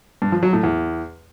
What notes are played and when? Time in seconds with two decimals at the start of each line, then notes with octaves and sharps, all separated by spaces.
0.22 G2
0.32 F3
0.43 F#3
0.53 A2
0.63 E2